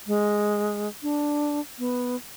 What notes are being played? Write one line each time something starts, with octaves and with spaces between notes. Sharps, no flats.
G#3
D4
B3